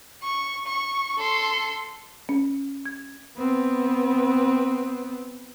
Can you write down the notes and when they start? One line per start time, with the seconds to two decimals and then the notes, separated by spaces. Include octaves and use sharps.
0.23 C#6
0.67 C#6
1.18 A4 C6
2.29 C#4
2.86 G#6
3.37 B3 C4